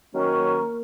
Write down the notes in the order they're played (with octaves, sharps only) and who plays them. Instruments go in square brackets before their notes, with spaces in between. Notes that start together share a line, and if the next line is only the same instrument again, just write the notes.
[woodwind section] D#3 F#3 C#4 F#4 A#4 [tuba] A#3